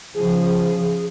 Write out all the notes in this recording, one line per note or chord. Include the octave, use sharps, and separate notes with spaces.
C#3 F3 G#4